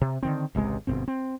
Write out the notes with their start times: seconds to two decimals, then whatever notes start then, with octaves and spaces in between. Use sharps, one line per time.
0.01 C3
0.23 D3 D#3 C4
0.55 G#1 C#2 C3 G#3
0.87 G1 C2 B2 C4
1.08 C4